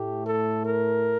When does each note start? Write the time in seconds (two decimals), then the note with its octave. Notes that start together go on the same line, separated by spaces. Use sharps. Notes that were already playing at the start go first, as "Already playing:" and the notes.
Already playing: A2 A3 G4
0.24 A4
0.64 A#4